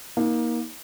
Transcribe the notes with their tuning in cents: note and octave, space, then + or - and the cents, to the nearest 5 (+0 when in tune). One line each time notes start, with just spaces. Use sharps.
A#3 +20 D#4 +30